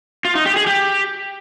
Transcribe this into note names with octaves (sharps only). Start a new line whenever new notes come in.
F4
D#4
G4
G#4
G4